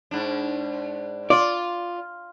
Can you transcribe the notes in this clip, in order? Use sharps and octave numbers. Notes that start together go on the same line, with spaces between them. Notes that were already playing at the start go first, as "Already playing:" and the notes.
G#2 D4
F4 D5